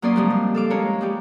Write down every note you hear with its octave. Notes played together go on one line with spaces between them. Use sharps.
F#3 A#3 C#4 D5 C6 D#6
G2 C#3 F3 G3 G#3 C4
C4
A4 F5 D6
G#3 A#3 C#4 A#4 C#5
G3 G#3 G4